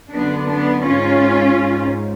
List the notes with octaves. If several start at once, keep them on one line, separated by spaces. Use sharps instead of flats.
F#2 D3 B3 D4
B3 D4
G#2 C#4 F4
G#2